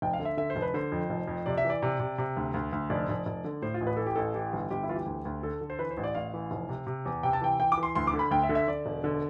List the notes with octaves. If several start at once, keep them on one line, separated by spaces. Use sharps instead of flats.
F1 G5
F5
D3
E5
D3 E5
C5
F1
B4
D3 C5
F2
F1
F2
C3 D5
E5
E3
D5
C3
C3
C3
D2
D2
D2
F1 D5
F1
F1
D3
A2 C5
F4
A1
B4
E3 A4
G4
A1 A4
E3 G4
G1
G1 G4
E4
E3 F4
G4
D2
D2
D3 A4
D3
C5
E3 B4
C5
A1
D5
A1 F5
E3
F1
C3
C3
E2
C3 G5
A5
E3 G5
E3 G5
D6
E3
C6
D2 C6
D6
D3
B5
D2 G5
E5
D3
E5
D3 D5
E1
D3